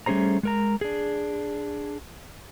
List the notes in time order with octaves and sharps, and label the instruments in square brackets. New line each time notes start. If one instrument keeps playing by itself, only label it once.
[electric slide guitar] G3 A3 C#4 G#4 C5 A#5
G#3 A#4 A#5
D4 G#4